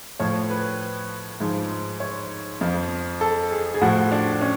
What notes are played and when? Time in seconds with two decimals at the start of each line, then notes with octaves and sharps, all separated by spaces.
0.20 A2 F3 C#5
0.50 B4
1.40 G#2 F3
2.00 C#5
2.61 F2 F3
3.21 A4
3.51 G#4
3.74 G#4
3.81 A2 F3 F#4
4.12 D4
4.41 C#4